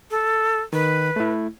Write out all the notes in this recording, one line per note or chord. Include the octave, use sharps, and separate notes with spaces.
A4
D#3 B4
A3 E4